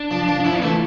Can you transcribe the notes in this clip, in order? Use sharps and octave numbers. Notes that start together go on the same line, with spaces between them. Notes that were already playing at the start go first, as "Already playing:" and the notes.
Already playing: D4
F3
F3
D4
F3 E4
E3 A3